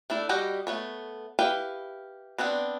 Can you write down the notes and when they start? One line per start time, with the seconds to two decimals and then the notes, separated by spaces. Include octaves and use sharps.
0.10 A3 D4 E4
0.29 G3 F#4 G4 D#5 F#5
0.67 A3 B3 C#5
1.39 E4 G4 B4 F5 G5
2.38 B3 C4 D4 F#5